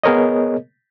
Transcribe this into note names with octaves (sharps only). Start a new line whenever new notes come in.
B3 G#4 A#4 C#5 D#5